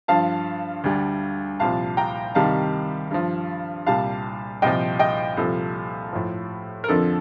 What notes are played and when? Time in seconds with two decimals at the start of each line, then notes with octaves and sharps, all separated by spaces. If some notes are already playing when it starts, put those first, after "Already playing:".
0.08 G2 F3 F5 A5
0.84 D2 D3 G3
1.60 C2 A#2 F3 F5 A5
1.97 G5 A#5
2.35 C2 C3 D#3 G3 F5 A5
3.11 G2 F3
3.86 C2 A#2 G3 F5 A5
4.62 C2 A#2 F3 D#5 G5
4.99 D#5 G5
5.37 C2 A#2 F3 A4
6.13 A2 F3
6.84 A#4
6.88 F2 D3 F3 A4